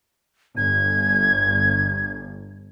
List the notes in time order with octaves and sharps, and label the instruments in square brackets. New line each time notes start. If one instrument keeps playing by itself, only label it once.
[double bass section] G1 [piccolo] G#6